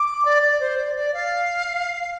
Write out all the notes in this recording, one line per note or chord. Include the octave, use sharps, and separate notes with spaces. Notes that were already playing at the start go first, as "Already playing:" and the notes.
Already playing: D6
D5
D5
C5
D5
D5
F5
F5